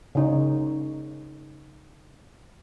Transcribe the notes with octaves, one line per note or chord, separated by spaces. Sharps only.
C#3 D#4 C#5